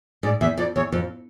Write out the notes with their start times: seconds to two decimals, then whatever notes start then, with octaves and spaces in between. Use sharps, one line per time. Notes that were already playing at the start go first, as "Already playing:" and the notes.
0.23 G#2 D5
0.41 E2 E5
0.57 F2 D5
0.75 E2 C#5
0.92 F2